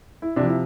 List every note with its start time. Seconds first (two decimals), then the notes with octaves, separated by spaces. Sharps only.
0.22 E4
0.36 C3 D4
0.40 F3
0.46 E4